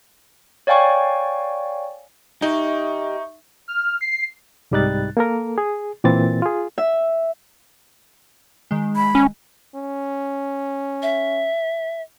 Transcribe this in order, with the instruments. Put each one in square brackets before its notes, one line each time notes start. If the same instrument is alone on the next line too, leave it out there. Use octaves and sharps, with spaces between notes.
[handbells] C#5 D5 F5 G5 G#5 C#6
[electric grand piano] D#4 [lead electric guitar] G4 D#5 [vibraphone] E5 C#6
[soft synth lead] F6
C7
[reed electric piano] C2 G#2 G3 D#4 F#6 A6
A#3 A4 A#4
G#4
A#2 E3 C4 A6
F4 G#4
[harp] E5
[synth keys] D#3 G#3
[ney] B5
[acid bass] C#4
[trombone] C#4
[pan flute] E5